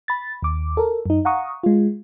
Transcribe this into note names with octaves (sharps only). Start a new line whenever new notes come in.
B5 A6
D#2 D6
A4 A#4
F#2 D#4
F5 F#5 A#5 C#6 D#6
G#3 F4